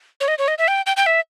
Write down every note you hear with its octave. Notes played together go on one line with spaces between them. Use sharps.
C#5
D#5
C#5
D#5
E5
G5
G5
G5
E5